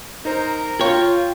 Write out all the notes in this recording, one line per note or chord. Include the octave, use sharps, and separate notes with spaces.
D#4 A#4 C5 A#5
F4 C#5 G5